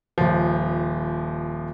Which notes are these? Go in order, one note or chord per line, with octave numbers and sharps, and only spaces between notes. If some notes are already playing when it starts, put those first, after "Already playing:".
D#1 F3